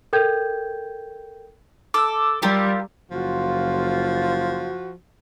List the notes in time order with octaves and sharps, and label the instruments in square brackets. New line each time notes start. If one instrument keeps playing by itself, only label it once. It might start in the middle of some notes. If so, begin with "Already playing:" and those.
[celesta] A4 A#4 G5 G6 G#6
[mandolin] A4 [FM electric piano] D6 E6
[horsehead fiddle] G3 [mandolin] F4 G4 A#4
[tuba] F#1 [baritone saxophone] F3 [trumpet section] F4 [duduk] F#4